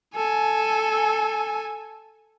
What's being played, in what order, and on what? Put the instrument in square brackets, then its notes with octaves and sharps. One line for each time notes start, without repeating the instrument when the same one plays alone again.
[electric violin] A4 G#5